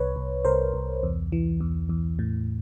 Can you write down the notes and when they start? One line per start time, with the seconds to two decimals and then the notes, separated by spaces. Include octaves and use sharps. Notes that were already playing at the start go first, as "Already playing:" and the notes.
Already playing: C2 B4 C#5
0.16 C2
0.45 C2 A#4 C5
0.74 C2
1.03 E2
1.32 E3
1.60 E2
1.89 E2
2.19 A2